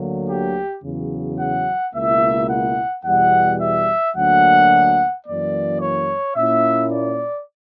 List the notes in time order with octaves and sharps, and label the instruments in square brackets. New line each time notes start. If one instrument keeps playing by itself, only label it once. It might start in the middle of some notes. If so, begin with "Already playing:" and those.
Already playing: [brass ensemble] D2 D3 F#3 A#3
G4
E2 C#3 F#3
F#5
C#2 B2 A#3 E4 E5
F#5
E2 B2 G3 F#5
E5
D2 D3 F#3 A#3 D4 F#5
F#2 E3 A#3 D5
C#5
A#2 A#3 C#4 E4 E5
D5